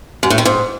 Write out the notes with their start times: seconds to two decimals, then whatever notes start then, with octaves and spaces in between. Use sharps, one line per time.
0.23 F#2
0.30 A2
0.38 D#3
0.45 G#2